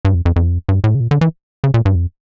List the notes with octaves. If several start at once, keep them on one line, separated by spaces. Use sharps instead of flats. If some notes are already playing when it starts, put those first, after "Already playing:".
G2
F2
F2
F2
G2
A2
C#3
A#2
D3
E3
C#3
A#2
G2
F2